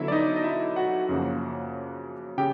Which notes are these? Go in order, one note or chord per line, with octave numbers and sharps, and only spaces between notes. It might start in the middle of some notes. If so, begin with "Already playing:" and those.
Already playing: D3 F#3 B3 E4 E5
D5
D#4 D#5
D#5
E4 E5
F#4 F#5
F#2 C#3 F3 A#3
C#3 G4 G5